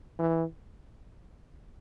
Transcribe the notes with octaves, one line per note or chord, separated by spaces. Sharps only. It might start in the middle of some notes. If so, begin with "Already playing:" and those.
E3